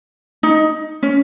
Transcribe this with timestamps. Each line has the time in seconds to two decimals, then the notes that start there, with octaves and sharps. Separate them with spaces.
0.43 D#4
1.03 C#4